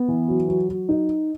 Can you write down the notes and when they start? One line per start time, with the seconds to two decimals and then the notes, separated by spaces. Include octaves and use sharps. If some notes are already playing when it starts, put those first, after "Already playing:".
Already playing: B3
0.08 E3
0.28 F#3
0.48 F#3
0.69 F#3
0.89 D#4